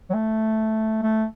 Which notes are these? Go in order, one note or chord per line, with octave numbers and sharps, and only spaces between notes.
F#3
A3
A3